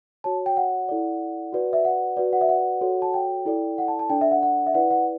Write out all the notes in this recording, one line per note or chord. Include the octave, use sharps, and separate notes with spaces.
F#4 C#5 A5
G5
F#5
E4 A4 D5
F#4 B4 D5
E5
F#5
F#4 B4 D5
F#5
E5
F#5
F#4 A4 C#5
A5
G5
E4 A4 D5
F#5
A5
A5
D4 A4 D5 G5
E5
F#5
F#5
E5
E4 B4 D5 F#5
F#5